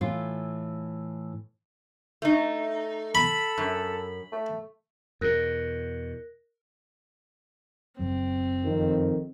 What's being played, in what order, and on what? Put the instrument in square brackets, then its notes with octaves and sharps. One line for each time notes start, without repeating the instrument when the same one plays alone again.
[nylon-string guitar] A2 E3 F4
[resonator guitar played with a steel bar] A3 D#4
[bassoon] A4 [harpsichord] B5
[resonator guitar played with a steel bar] F#2
[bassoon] A3
[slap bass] E2 B2 [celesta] A#4 F#6 A#6
[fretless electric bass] F#1 F#2 F#3 [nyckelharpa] C4
[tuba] F2 [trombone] D#3